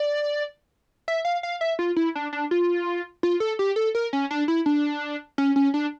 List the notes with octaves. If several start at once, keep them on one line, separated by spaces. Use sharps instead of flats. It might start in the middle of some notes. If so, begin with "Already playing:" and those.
Already playing: D5
E5
F5
F5
E5
F4
E4
D4
D4
F4
F4
A4
G4
A4
A#4
C#4
D4
E4
D4
C#4
C#4
D4